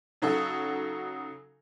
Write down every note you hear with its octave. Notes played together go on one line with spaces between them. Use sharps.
C#3 F#3 D#4 F#4 A4